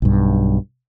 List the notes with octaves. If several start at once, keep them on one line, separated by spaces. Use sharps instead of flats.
B1 G2